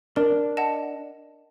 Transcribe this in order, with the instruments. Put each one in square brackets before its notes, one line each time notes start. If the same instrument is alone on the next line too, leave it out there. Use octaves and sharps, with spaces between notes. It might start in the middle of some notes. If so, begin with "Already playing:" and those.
[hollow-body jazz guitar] D4 [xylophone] A#4
[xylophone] D#5 F#5 A5